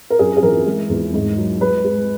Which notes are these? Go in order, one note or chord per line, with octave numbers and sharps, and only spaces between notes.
A#4
F#2 G#4
G#4
E3 A#4
G#3
E2
G#2
F#3
G#3 B4
G#3